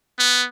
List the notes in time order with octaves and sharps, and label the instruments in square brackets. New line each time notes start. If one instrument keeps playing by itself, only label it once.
[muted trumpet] B3